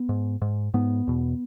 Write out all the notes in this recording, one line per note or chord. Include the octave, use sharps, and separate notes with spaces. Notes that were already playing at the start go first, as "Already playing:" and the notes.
Already playing: B3
G#2
G#2
G#2 B3
E2 B2